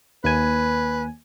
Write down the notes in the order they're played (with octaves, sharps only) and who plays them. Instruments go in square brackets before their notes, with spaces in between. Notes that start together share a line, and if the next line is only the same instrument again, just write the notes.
[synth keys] D#2 G#5 [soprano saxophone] B4